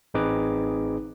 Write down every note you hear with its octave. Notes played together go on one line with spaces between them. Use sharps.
A1 C4 D#4 G#4 B4 D6